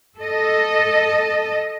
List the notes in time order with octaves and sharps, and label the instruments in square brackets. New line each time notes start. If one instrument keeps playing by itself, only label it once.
[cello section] A4 D#5